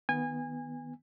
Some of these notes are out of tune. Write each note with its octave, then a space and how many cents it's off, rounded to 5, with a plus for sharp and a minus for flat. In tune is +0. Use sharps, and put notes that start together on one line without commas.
D#3 +0 B3 +0 G#5 -25